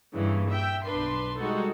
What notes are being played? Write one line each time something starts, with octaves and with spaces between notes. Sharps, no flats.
G2 A#2 C#3 E3
E5 G5
B1 D4 B4 C6
G3 G#3 D#4 F#4 A4